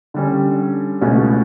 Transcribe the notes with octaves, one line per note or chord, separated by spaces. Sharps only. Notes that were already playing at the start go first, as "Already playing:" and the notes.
D3 G3 C#4
C#2 B2 A3 C#4 F#4